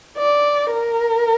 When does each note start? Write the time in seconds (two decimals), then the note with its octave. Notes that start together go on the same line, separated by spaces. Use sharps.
0.17 D5
0.71 A#4